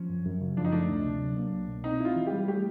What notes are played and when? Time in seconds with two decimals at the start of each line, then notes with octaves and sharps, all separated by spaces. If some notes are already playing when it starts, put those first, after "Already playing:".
Already playing: F3 C#4
0.10 F#2
0.25 F#2
0.41 C#3
0.57 F3 D4
0.65 D#4
0.72 A3 D4
0.89 D2
1.05 C3
1.21 F#3
1.37 A#3
1.52 C2
1.68 B2
1.84 C4 D#4
2.00 E4 F4
2.16 E3
2.27 G4
2.32 G3
2.48 A3 G4